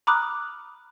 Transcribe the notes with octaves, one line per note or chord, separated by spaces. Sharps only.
A#5 B5 D6 D#6 F6 F#6